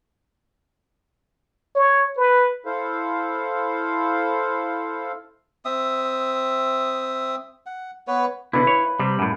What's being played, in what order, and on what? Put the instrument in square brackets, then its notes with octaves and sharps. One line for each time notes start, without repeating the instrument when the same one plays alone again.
[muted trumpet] C#5
B4
[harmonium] E4 A4 C5 F5
[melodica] C4 E5 D#6
F#5
B3 B4 C#5
[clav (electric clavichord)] B2 D3 [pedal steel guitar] E4 [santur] B4 F5
[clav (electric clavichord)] C#5
[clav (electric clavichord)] C3 [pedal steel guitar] G3
[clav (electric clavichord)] F#2 A2